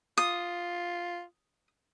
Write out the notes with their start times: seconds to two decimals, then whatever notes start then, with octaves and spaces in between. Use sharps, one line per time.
0.18 F4 D#6